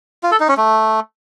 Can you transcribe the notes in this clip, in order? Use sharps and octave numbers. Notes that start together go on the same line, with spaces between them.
F4
A4
D#4
C#4
A3